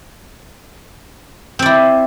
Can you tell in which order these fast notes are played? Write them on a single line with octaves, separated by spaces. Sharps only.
C4 D5 E4